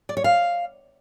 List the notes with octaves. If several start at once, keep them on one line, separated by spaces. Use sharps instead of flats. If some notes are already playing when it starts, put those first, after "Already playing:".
D5
C#5
F5